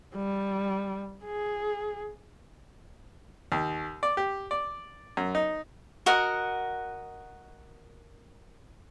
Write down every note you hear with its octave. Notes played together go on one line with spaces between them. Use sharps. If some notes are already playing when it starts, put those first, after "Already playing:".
G3
G#4
D#2
D5
G4
D5
F#2
D#4
F#4 A#4 D#5 F#5